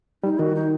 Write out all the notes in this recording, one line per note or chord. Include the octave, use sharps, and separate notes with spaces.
G3 D#4
D#3 F#4
D#4